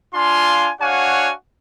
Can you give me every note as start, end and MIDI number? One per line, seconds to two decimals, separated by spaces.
0.15 0.70 62
0.15 0.70 65
0.15 0.70 77
0.15 0.70 80
0.15 0.70 84
0.81 1.32 62
0.81 1.32 66
0.81 1.32 73
0.81 1.32 77
0.81 1.32 78
0.81 1.32 80